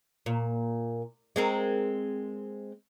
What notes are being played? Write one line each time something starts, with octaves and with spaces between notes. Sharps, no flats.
A#2
G#3 C4 A#4